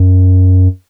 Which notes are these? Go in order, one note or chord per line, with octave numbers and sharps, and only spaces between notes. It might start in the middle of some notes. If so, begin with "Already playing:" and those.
Already playing: F#2